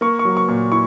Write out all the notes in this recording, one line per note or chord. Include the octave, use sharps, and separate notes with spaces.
A#3 C#6
C#6
F#3
C#6
A#2
E4 C#6